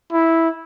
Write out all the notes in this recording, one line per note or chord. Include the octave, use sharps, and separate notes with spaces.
E4